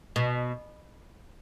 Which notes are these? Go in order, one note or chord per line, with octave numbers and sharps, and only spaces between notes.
B2